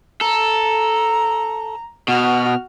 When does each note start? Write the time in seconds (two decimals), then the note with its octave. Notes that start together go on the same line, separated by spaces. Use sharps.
0.21 A4 A#5
2.08 B2 F#4 F6